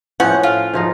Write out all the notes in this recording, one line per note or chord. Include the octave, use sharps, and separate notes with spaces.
A2 F3 C#4 F#5
F4
G#2 F3 D#4